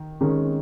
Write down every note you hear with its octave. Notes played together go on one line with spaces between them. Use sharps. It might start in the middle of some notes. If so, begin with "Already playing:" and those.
Already playing: D#3
D#3 G#3 C#4